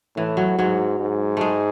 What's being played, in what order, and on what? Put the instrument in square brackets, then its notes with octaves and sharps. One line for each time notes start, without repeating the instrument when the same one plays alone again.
[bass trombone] A2 [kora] E3
[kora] F#3
[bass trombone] G#2 [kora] F#3
[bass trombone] G#2
[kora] G#3 A3